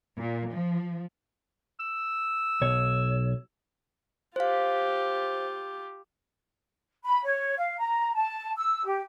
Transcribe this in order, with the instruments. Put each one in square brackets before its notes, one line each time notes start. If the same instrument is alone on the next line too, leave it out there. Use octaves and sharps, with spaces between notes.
[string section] A#2
F3
[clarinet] E6
[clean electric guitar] B1 C#5
[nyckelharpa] F4 G4 [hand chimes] C5 F5
[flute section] B5
C#5
F5
A#5
A5
E6
G4